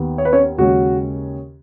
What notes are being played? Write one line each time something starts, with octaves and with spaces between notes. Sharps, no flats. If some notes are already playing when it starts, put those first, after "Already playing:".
Already playing: D#2 D#3 B3
C#5
B4
C#4 C#5
D#2 C#3 G#3 C#4 F#4